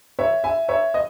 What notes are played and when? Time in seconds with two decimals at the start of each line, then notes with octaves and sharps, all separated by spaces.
0.19 C#5 E5
0.44 E5 G#5
0.69 C#5 E5
0.94 D#5